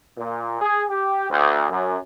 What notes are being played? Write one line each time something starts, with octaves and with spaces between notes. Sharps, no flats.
A#2
G#4
G4
D2
F#2